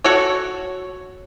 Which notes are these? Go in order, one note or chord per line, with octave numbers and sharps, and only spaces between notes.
F#4 A4 C#5